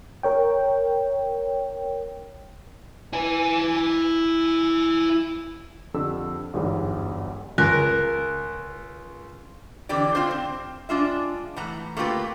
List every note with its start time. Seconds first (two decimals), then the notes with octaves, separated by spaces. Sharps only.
0.23 A#4 C#5 G5
3.13 E4 G#5
5.94 F2 D3 G4 E6
6.53 G1 E2 G#2 F#3 G3
7.58 C#2 A#4 F#6
9.89 D3 E3 C4 G4 D5
10.15 C4 D4 F4 C5
10.31 C4
10.89 G#3 D4 F4 E5
11.56 A2 E3 F#5 A#5
11.97 A3 A#3 C4 F4 G4 B4